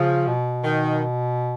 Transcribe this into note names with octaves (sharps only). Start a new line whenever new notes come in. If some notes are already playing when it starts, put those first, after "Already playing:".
Already playing: C#3 F3
B2
D#3